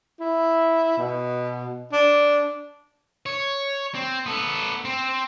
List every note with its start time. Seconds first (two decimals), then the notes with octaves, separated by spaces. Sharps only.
0.20 E4
0.98 B2
1.93 D4
3.26 C#5
3.95 C4
4.26 B3 A4
4.85 C4